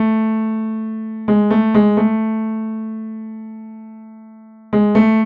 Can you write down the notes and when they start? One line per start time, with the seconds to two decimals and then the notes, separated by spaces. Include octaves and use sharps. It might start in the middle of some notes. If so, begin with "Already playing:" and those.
Already playing: A3
1.28 G#3
1.50 A3
1.74 G#3
1.97 A3
4.73 G#3
4.95 A3